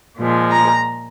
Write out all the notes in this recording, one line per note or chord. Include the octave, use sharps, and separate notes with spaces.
A#2 F3 G#3
A#5